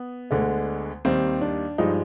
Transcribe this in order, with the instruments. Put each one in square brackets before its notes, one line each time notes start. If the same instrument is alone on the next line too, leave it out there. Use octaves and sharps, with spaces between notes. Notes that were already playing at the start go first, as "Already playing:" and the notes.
Already playing: [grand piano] B3
D2 D3 G#3
D#2 D#3 G3 C4
D4
G2 F3 G#3 D#4